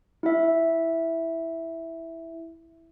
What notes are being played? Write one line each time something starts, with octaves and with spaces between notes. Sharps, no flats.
E4 E5